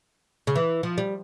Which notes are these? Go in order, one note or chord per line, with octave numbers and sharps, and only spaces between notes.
C#3
E3
F3
G3